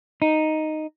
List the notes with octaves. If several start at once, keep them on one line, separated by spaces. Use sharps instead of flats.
D#4